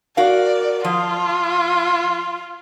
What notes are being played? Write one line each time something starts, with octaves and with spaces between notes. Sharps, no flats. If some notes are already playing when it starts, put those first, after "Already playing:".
F#4 A#4 D5 F5
F3 F4